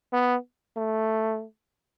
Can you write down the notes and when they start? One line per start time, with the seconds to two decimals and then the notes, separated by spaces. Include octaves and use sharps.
0.13 B3
0.76 A3